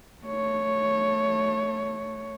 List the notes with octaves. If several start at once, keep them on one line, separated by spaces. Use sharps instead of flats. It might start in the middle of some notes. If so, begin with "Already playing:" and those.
A3 C#5